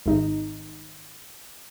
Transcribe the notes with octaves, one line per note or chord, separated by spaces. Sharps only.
G#1 D#4